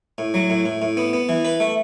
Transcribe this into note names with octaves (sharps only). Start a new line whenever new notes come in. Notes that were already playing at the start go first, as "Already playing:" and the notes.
A2
F#3
A2
A2
A2
B3
B3
E3
B4
A3